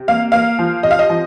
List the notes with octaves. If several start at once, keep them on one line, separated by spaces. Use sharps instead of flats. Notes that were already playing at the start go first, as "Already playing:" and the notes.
Already playing: C3
A#3 F5
A#3 F5
F3
C3 D#5
F5
D#5
F3